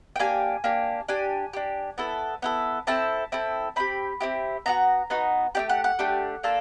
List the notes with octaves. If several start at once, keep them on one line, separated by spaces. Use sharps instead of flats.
G5
A#3 D4 G4 G#5
A#3 D4 G4
D4 G4 G#5
D4 G4
B3 E4 A4
B3 E4 A4
C4 E4 A4 A5
C4 E4 A4
C4 E4 G4 B5
C4 E4 G4
B3 D#4 F#4 A#5
B3 D#4 F#4
A3 D4 G4 G5
F#5
F#5
A3 D4 G4
A#3 D4 F4 A4 A5